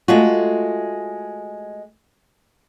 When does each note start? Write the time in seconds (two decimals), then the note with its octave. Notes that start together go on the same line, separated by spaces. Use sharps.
0.08 G#3 A3 F4 F#4